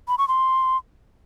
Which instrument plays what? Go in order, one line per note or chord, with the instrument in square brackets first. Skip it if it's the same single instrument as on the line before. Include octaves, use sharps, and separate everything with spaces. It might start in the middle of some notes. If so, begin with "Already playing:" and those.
[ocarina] B5
C#6
C6